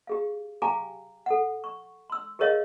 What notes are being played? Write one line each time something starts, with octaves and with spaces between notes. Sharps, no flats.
G4 G#4 F5
G4 F5 G5 G#5 A#5 D6
A4 F#5
C#6
C6 E6
G4 G#4 A#4 C#5 D#5 F5